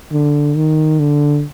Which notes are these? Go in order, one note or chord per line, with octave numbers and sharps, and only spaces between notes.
D3
D#3
D3